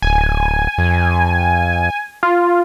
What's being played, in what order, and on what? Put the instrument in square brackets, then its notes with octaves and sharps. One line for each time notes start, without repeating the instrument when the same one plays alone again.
[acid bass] D1 [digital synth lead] G#5
[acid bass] F2
[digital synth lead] F4